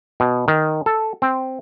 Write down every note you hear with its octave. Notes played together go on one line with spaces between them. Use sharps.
B2
D#3
A4
C4